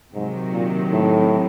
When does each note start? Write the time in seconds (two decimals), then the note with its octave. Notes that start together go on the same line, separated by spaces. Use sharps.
0.14 G#2 C3 D#3 F#3
0.53 A#2
0.91 A2